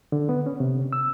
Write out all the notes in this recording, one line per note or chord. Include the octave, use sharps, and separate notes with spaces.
D3
B3
C#4
C3
E6